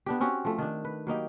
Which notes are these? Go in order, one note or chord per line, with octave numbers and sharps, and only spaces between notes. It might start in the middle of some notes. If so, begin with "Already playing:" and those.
B3 D4 G4
C4 C#4 F#4 G4
F3 A3
D#3 D4
B4
F#3 A#3 D#4 G4